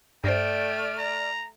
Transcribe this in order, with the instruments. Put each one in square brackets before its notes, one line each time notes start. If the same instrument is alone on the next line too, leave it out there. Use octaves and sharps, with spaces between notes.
[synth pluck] G2 C5 [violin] A3 [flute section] D5 F6 [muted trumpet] G5
[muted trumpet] A#5